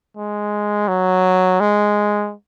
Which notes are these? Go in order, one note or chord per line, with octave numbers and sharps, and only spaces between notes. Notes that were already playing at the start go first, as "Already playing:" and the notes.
G#3
F#3
G#3